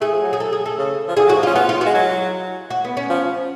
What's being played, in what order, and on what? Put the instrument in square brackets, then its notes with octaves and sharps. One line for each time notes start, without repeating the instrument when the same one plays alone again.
[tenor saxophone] A3 [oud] G#4
[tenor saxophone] F3
F#3
[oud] G#4
A4
G#4
A4
[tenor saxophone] C#3
F3
[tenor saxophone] D3 [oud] G#4
[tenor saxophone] F#3 [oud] F#4
[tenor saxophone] F3
[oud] F4
[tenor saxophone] C#4
[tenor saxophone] B3 [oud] F4
[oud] F4
F#4
[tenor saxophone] G#3
F#3
[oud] F#4
B3
C#4
[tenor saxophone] F3